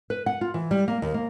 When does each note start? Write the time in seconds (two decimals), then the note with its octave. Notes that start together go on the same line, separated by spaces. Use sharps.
0.10 B4
0.26 F#5
0.41 F4
0.54 E3
0.71 G3
0.88 A#3
1.02 D#2
1.14 A#3